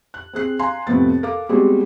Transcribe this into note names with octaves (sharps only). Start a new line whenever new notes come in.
F#6
C4 G#4 F#6 C7
F5 G#5 A#5 C6
F2 A2 C3 B3 C4 A6
A4 A#4 F5 D6
B2 G3 G#3 C4 F#4 G#4